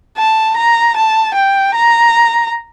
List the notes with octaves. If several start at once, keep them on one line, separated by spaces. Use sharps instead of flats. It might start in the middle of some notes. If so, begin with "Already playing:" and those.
A5
A#5
A5
G5
A#5